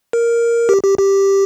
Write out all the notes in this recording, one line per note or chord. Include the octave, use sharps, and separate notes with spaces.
A#4
G4
G4
G4